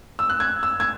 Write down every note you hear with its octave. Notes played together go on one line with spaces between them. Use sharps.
E6
F#6
G#6
E6
G#6